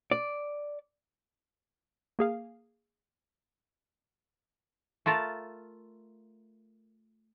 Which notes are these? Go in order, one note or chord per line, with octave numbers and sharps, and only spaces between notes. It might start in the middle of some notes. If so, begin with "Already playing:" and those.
D5
A#3 G#4 F5
A3 F4 A#4 A5